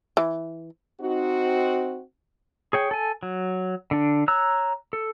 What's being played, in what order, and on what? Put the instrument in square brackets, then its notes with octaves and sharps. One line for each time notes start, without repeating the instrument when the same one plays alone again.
[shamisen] E3
[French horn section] C4 D#4 F#4
[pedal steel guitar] G#4 C#5 G5
A4 G#5
F#3
D3 D4
C#5 A#5 E6 F#6
A4